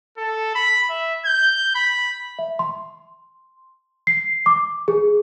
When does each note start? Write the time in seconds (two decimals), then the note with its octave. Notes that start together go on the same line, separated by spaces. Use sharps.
0.18 A4
0.55 B5
0.90 E5
1.26 G6
1.75 B5
2.39 E5
2.59 C6
4.07 C7
4.46 D6
4.88 G#4